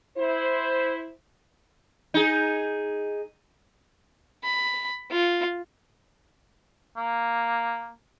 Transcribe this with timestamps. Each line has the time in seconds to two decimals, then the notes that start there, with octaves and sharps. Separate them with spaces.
0.18 E4 C5
2.14 D#4 G#4
4.44 B5
5.11 F4
6.97 A#3